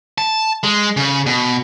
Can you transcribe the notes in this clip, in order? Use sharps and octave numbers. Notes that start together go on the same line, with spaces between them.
A5
G#3
C#3
B2